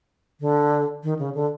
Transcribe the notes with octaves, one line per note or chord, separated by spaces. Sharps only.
D3
D#3
C#3
D3